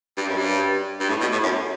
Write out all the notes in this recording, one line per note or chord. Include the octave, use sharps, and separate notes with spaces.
G2
F#2
G2
G2
A2
B2
A2
F#2